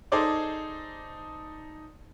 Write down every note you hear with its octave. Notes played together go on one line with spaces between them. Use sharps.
D#4 G#4 A4 C5 D5 D6